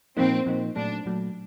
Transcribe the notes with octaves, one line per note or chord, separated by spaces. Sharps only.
A#2 F3 A#3 C4 D#4
A#2 F3 A#3 D#4
A#2 F#3 A3 D4
A#2 F#3 A3